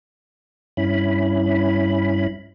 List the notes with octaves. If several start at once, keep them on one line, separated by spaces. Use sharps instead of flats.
G2 C#4 E4 B5